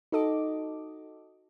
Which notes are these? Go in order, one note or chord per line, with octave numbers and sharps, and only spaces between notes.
D#4 F#4 A4 D#5 D6